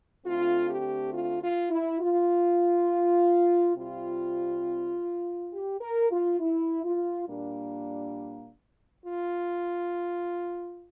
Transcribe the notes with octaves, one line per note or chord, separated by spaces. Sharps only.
D3 A3 C4 F4
G4
F4
F4
E4
F4
C3 G3 C4 F4
G4
A#4
F4
E4
F4
A#2 G3 A#3 D4
F4